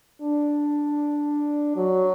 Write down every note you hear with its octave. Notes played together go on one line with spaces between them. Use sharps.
D4
F#3